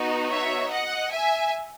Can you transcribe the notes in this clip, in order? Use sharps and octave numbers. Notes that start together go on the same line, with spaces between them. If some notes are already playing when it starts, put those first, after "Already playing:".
Already playing: B3 D#4 F#4
C#5 E5
D#5 F#5
E5 G#5